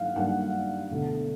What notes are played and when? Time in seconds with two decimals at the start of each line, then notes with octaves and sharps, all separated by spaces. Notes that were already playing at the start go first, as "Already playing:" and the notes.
Already playing: G2 D#3 F#3 A#3 F5 F#5
0.15 G2 D#3 F#3 A#3 F#5
0.90 E1 D2 D3